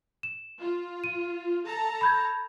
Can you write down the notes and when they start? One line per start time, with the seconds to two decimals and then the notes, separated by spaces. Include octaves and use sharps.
0.23 E7
0.59 F4
1.04 D#7
1.66 A4 A5 A#5
2.01 B5 G6 G#6